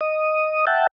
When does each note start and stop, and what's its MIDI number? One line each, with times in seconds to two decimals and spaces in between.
0.01 0.65 75
0.01 0.65 87
0.67 0.87 76
0.67 0.87 78
0.67 0.87 79
0.67 0.87 81